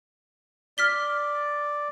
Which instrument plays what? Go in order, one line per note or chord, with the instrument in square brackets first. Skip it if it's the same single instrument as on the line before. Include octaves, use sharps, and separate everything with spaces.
[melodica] D5 [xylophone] F6 B6 G7